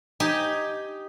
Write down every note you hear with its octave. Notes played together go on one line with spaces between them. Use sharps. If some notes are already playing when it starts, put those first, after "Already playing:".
D#4 G4 G#5